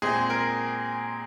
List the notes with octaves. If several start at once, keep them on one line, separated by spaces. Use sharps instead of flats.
A#2 G#3 C4 G#4
A#4